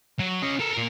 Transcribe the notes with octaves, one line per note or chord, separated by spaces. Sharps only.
F#3
C#4 D#5
A4 A#4
A#2 A#4